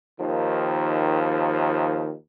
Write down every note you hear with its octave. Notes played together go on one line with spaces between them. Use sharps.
D#2 D#3 F3